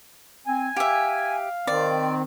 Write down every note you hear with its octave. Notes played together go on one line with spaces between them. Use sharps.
C4 G#5
G4 E5 F5
D#3 C4 D5